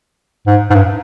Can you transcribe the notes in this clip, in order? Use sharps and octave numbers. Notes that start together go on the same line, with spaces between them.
G#2
G#2
G2